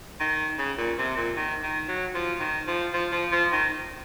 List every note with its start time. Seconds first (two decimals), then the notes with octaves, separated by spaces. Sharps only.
0.20 D#3
0.59 C#3
0.78 A#2
0.98 C3
1.17 A#2
1.36 D#3
1.63 D#3
1.88 F#3
2.14 F3
2.40 D#3
2.67 F3
2.93 F3
3.12 F3
3.32 F3
3.52 D#3